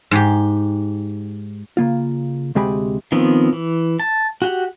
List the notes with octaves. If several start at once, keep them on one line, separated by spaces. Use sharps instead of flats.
G#2 G4
C#3 A#3 F4
D2 C3 G#3 G4 G#5 B5
D#3 F3 B3 C4
E3
A5
F#4 G4 F#5